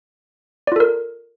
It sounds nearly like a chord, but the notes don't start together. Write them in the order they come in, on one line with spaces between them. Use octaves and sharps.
D5 F4 A4 A#4